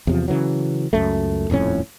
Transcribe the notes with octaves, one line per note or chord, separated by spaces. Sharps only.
E2 C3 F3
C#3 E3 F#3
C#2 F#2 A3
D#1 F2 A2 C#4